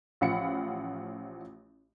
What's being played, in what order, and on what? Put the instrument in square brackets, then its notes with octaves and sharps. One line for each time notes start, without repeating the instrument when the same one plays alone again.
[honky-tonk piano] A1 F3 F5 F#5 B5 C#7